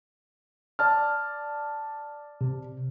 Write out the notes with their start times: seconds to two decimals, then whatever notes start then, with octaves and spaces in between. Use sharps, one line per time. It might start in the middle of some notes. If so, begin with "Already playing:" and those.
0.79 D5 A5 F6
2.41 C3